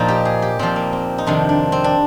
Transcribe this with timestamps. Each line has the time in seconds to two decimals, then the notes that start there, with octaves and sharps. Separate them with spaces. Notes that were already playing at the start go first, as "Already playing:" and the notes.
Already playing: A#2 F3 D#4
0.08 G4
0.25 G#4
0.42 G4
0.59 A#2 F3 C4
0.76 A#3
0.93 C4
1.18 D#4
1.26 F2 C3 D#3 D4
1.49 D4
1.72 C4
1.84 D4